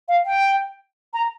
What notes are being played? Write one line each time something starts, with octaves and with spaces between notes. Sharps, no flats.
F5
G5
A#5